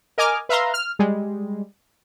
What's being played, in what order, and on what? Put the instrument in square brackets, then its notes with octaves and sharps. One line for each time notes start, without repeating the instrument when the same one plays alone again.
[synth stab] A#4 D#5 G#5 D6 F6
B4 E5 F5 A#5 C6
F6
G3 G#3